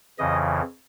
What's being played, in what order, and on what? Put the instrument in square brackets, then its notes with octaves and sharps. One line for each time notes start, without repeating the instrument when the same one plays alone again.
[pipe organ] F2 C#3 E3 D#5